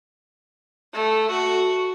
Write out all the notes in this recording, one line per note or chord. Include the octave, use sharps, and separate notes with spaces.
A3
F#4